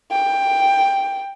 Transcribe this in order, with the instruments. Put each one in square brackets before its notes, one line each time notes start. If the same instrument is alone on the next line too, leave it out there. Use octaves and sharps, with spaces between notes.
[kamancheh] G5